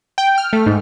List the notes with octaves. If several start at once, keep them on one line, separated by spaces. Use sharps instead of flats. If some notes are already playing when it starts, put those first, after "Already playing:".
G5
F6
A3
G#2